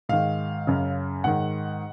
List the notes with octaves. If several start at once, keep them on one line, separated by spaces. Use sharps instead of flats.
G#2 D#3 F5
F#2 C#3
G#2 D#3 F#5